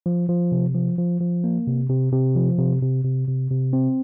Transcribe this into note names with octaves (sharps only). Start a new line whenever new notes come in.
F3
F3
C3
F3
F3
F3
A#3
C3
C3
C3
F3
C3
C3
C3
C3
C3
C4